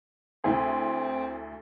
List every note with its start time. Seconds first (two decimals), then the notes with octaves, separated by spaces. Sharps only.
0.44 D2 C4 E4 G#4